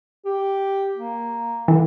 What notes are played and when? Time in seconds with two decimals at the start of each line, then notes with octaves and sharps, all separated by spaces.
0.26 G4
0.97 A#3
1.68 D3 E3